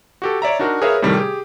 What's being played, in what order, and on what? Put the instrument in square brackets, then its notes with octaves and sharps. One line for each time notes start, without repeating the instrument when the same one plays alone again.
[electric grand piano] F#4 G4 A4
C#5 D5 E5 A#5
D4 D#4 F#4 A#4
G#4 A#4 B4 C#5 E5 F5
A2 C3 D#3 G3 A3
G4 G#4